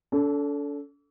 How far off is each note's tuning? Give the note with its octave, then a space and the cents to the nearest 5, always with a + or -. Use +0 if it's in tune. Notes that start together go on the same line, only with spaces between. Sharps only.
D4 -45 A4 -5